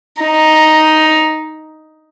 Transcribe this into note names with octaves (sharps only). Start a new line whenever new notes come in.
D#4